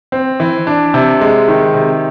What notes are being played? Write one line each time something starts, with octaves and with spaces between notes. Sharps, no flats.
C4
E3
D4
C3
G#3
D#3
C3